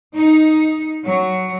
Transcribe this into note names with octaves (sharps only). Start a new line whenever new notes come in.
D#4
F#3